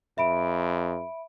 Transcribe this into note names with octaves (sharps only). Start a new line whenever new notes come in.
F2 E5 B5 D7